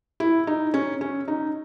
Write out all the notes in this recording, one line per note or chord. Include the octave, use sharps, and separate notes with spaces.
E4
D#4
C#4
C#4
D#4